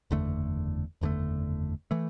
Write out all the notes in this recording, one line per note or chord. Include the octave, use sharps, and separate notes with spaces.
F#1 E2 D3 A3
F#1 E2 D3 A3
E3 A3